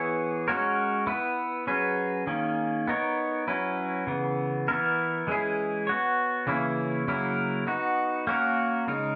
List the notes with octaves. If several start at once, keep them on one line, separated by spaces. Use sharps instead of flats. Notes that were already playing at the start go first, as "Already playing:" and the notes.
Already playing: E3 B3 E4 G#4 C#5
G#3 C#4 F#4 A#4 C#5
B3 E4 B4
F#3 C#4 G#4 B4
D#3 A#3 C#4 G#4
B3 D#4 A#4 C#5
F#3 C#4 E4 B4
C#3 E3 B3
E3 B3 E4 A#4
E3 G#3 C#4 E4 G#4
B3 F#4 C#5
C#3 E3 A#3 C#4 E4
C#3 F#3 A#3 E4 A#4
B3 D#4 F#4
A#3 C#4 F#4 A#4
C#3 G#3 D#4 A#4